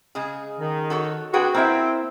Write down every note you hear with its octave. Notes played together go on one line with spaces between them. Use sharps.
C#3 G#3 G#4
D#3
F#4 A4 C#5
C4 D4 F#4 G#4 B4 G5
A#3 C4 E4 E5